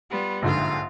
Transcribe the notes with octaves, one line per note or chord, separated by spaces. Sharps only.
G3 B3 F4
A#1 G#2 D3 F4 F5